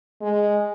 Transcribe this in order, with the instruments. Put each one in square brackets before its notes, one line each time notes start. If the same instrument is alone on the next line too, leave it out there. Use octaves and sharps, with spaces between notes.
[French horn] G#3